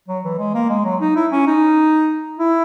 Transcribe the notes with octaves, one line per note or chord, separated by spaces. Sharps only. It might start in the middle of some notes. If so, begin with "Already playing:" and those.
F#3
E3
G#3
A#3
G#3
F#3
D#4
E4
C#4
D#4
E4